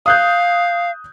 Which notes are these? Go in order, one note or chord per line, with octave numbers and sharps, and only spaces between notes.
F5 D#6 F#6 G6